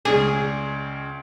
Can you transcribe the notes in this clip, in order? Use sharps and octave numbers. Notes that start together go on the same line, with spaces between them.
C#2 C#3 G#4 D5